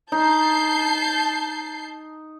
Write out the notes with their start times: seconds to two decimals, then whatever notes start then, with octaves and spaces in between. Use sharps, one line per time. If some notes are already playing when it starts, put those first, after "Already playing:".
0.12 D#4 A5 G6 C7